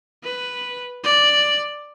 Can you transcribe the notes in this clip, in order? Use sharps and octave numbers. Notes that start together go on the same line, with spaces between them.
B4
D5